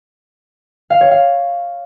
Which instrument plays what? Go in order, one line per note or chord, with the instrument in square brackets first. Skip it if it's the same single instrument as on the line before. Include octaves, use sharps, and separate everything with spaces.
[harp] F5
C#5
F5